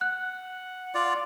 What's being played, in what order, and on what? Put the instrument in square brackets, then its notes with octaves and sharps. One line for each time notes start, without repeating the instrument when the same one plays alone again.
[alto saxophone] F#5 [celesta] F#6
[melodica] F4 D5